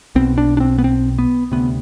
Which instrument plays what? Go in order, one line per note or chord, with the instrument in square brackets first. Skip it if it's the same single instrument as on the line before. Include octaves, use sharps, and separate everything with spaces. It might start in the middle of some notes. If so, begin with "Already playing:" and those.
[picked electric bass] B1 B2 C4
D4
D4
C4
B3
C4
B3
D2 C3 B3